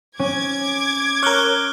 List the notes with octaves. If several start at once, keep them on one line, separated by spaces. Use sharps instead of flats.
C#4 D6 G#6
A#4 C#5 F6 F#6 G7